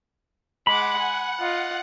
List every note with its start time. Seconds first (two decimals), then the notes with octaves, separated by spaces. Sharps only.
0.67 G#3 F#5 B5 D6
0.98 G#5
1.40 F4 D#5